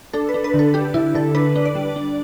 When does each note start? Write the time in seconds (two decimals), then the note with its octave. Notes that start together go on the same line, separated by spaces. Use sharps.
0.13 D4 A4
0.29 B4
0.34 D4
0.44 B4
0.54 D3
0.59 A4
0.74 D4 G4
0.94 D3 E4
1.15 D3 A4
1.35 D4 B4
1.56 D4
1.65 D5
1.75 G3
1.96 D4